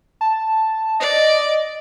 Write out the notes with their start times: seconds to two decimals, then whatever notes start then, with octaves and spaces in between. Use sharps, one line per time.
0.21 A5
1.00 D5 D#5